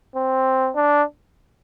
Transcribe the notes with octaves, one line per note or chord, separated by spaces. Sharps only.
C4
D4